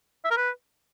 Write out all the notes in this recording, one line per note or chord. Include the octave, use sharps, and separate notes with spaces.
E5
A#4
B4